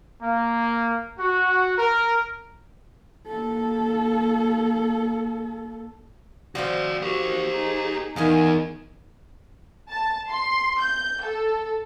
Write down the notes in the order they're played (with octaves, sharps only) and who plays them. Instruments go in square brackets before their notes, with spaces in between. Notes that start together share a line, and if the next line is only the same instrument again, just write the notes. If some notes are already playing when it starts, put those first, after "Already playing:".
[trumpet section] A#3
F#4
A#4
[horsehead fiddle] A#3 A4
[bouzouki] F3 C4 C5 [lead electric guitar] F#4 D5
[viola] F#4 C#6 [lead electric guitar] G4 A#4
[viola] D#4 G#4
[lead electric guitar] E2 [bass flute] D#3 [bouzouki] E4 D#5 F5 [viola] G#5
[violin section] A5
C6
G6
A4